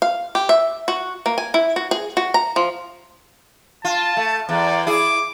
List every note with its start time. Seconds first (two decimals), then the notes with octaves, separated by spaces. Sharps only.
0.02 F5
0.35 G4
0.49 E5
0.88 F#4
1.26 A#3
1.38 G#5
1.54 E4
1.76 F#4
1.91 G#4
2.17 F#4
2.34 A#5
2.56 F3
3.85 F4 A5
4.17 A3
4.49 E2 D5
4.87 E4 G#4 D6